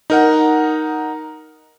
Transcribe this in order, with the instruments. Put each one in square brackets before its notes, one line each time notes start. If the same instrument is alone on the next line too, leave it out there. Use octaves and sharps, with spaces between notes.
[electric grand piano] D#4 A#4 F#5